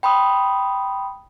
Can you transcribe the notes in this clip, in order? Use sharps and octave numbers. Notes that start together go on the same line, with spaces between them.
G5 B5 C6 D#6